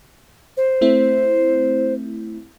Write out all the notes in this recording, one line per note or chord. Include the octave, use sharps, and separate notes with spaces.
C5
A3 C4 E4